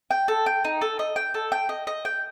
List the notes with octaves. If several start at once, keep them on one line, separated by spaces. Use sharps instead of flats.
G5
A4
G5
D#4
A4
D#5
G5
A4
G5
D#5
D#5
G5